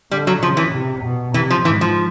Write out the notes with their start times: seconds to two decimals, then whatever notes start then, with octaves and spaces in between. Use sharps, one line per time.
0.11 D3 G3
0.27 F#3
0.41 C#3 F3
0.57 E3
0.73 C3
1.04 B2
1.34 C3 E3
1.51 F3
1.65 G#2 E3
1.81 F3